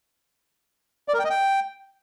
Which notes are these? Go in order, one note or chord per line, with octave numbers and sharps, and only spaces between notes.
D5
A#4
G5
D#5
G5